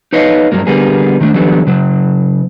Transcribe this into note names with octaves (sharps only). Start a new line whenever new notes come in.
D#4 B4 C#5 D#5 F5
G2 F#3 A#3
D3 G3 A#3 B3 G#4
D#3 A3 D4
D3 E3 F#3 G3 B3
C#3 F#3